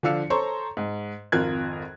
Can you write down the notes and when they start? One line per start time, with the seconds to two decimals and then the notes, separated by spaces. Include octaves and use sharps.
0.03 D3 F3 D4 F5 E6 C#7
0.30 A4 C5 C#5 A#5 C6 C#6
0.77 G#2
1.32 G#1 F2 F4 A#4 F#6 G#6